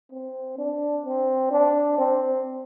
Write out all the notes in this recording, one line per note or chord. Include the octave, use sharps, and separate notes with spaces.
C4
D4
C4
D4
C4